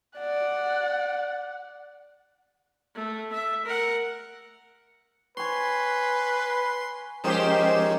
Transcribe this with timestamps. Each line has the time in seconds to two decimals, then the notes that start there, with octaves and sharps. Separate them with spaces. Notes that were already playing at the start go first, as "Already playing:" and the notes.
0.18 D5 F#5
2.95 A3
3.33 E5
3.65 A#4 F#5
5.37 B4 C#5 G#5 C6
7.24 D#3 F3 G#3 C#4 D#4 G4 C5 E7